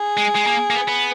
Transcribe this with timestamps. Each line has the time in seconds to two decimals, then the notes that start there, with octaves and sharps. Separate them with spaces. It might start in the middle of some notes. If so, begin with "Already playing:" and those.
Already playing: G#4
0.17 G#3
0.35 G#3
0.47 A#3
0.70 A#3
0.75 B3
0.88 B3